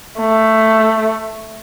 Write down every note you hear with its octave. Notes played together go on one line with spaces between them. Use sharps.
A3